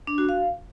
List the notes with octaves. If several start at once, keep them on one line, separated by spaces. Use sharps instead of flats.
D4
F#4
F5